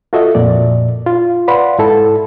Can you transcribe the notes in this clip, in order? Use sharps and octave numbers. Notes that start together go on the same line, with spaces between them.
F4 F#4 A4 D#5 E5
F2 A#2 D5
F4
B4 D5 F5 F#5 B5 C6
G#2 E4 A4 A5